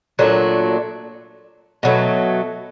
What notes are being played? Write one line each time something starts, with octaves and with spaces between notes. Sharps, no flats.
A#2 F#3 A3 D4
B2 F#3 A3